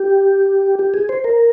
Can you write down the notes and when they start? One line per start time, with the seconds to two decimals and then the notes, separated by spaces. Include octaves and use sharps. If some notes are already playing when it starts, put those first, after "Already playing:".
Already playing: G4
0.79 G4
0.94 G#4
1.09 C5
1.24 A#4